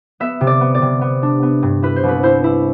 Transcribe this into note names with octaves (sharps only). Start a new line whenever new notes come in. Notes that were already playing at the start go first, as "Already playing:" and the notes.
B3 E5
C3
D5
B3
D5
C3
B3
D4
B3
G2
E4 B4
C5
C2
B4
E4 C5
E4